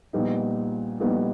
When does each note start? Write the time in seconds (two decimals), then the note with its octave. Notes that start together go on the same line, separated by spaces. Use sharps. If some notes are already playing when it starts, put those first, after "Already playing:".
0.13 A#1 A#2 G3 B3 D#4
1.00 A#1 A#2 G3 B3 D#4